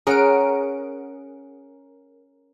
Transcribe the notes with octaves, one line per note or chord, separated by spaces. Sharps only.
C#4 G#4 A#4 F#5 D7